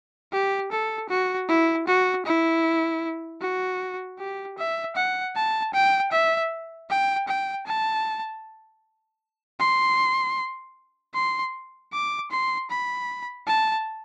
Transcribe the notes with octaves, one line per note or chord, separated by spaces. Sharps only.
G4
A4
F#4
E4
F#4
E4
F#4
G4
E5
F#5
A5
G5
E5
G5
G5
A5
C6
C6
D6
C6
B5
A5